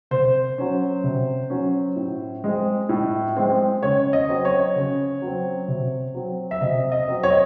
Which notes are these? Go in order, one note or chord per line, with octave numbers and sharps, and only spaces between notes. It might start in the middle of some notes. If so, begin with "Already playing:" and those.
C3 C5
F#3 C#4
C3
F#3 C#4
A2
G#3 C4
A2
G#3 C4
C#3 C#5
D#5
F#3 C4
C#5
C#3
F#3 C4
C3
F#3 C4
E5
C3 D#5
D#5
F#3 C4
C#5
D#5